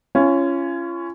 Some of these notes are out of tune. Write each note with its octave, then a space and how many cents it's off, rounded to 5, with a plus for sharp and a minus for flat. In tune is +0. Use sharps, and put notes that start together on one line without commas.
C#4 +0 F4 -35